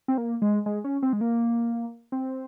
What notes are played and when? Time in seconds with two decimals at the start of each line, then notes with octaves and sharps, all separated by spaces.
0.08 C4
0.18 A#3
0.42 G#3
0.66 G#3
0.84 C#4
1.02 C4
1.13 G#3
1.21 A#3
2.12 C4